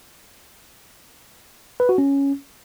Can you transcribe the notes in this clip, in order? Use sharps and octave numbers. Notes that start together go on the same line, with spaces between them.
B4
F#4
C#4